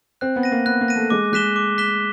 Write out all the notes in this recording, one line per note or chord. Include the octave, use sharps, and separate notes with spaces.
C4 F#6
B3
A#6 D#7
A#3
B3 F#6
A#3
A#6 D#7
A3
G#3 D6
G#3 F#6 B6 E7 G7
D6
F#6 B6 E7 G7